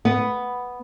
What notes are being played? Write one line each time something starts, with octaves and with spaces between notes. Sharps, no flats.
B3